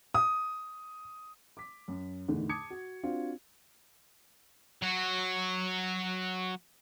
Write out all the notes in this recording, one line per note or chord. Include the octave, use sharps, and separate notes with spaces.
D#6
D6 B6
F#2
E2 A2 D3 D#3
A5 D6 D#6 G#6 C#7
F#4
C4 D4 F4 F#4
F#3 F#4